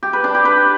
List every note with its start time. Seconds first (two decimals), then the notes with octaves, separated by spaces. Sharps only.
0.03 G4
0.13 B4
0.24 D4
0.35 G4
0.45 B4